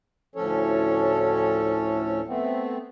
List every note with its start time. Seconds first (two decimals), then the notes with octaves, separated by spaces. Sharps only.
0.35 D2 A2 F3 C#4 A4 C#5
2.27 A3 B3 C4